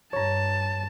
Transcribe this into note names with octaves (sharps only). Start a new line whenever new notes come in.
G2 C#5 A5 A#5